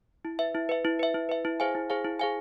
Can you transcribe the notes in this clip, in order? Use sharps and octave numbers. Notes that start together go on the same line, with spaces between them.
E4
B4 E5
E4
B4 E5
E4
B4 E5
E4
B4 E5
E4
G#4 C5 F5 G#5
E4
G#4 C5 F5 G#5
E4
G#4 C5 F5 G#5